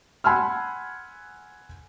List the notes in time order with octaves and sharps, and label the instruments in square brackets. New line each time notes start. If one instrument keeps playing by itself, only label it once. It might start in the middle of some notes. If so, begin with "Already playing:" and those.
[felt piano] F#5 G#5 B5 C6 E6 F6